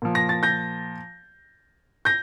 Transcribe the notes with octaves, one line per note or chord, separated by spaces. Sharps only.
A#2 F3
A#6
A6
G6 A#6
G6 A#6